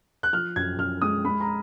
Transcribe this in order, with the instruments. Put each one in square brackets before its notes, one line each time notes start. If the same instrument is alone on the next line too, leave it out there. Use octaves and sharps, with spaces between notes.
[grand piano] F#6
F3 F6
F#2 G#6
F#2 F6
G#3 D#6
G#3 B5
A#5